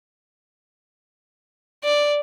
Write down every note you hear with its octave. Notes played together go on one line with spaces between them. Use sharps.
D5